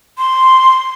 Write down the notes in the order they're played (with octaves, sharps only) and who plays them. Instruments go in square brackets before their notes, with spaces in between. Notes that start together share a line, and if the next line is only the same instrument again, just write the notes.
[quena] C6